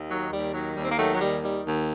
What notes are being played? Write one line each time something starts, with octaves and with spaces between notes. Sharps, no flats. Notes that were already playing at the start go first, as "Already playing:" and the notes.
Already playing: D#2
D#3 F#3
D#2 G3
D#3 F#3
D#2 G3
C4
A#3
D#3 F#3 A3
F#3
D#2 G3
D#3 G3
D#2